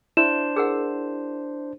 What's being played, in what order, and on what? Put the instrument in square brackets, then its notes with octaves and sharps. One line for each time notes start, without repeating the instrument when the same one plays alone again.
[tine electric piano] D4 C5 [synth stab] E4 [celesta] E7
[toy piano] G#4 A#4 F#5